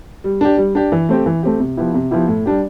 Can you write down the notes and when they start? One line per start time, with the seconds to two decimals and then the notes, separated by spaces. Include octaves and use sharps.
0.24 G3
0.41 D4 G4
0.58 G3
0.75 D4 G4
0.92 E3
1.09 A3 C4 G4
1.26 E3
1.43 A3 C4 G4
1.60 C3
1.77 F3 B3 E4 G4
1.94 C3
2.11 F3 B3 E4 G4
2.28 A2
2.46 G3 D4 G4